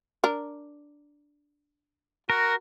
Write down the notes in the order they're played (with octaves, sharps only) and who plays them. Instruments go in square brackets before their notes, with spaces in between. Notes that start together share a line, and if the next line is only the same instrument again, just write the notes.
[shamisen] D4 A#4
[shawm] F#4 [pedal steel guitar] A#4